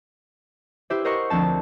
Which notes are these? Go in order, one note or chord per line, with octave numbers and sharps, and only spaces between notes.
E4 G4 B4 C5 E5
A#4 C5 D#5 F#5 C#6
D2 F3 C4 A5